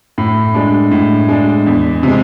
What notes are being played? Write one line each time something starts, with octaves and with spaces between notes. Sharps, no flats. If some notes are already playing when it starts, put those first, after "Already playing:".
A2
G#3 D4
A2
G#3 D4
E2
C3 G#3